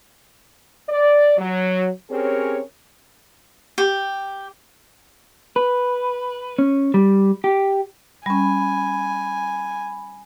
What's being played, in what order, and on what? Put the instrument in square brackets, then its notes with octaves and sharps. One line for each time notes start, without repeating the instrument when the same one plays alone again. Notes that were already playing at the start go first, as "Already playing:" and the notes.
[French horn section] D5
F#3
C4 C#4 G4 G#4 A#4 C#5
[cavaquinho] G4
[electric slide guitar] B4
C#4
G3
G4
[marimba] G3 C#4 [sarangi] G#5 [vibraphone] B5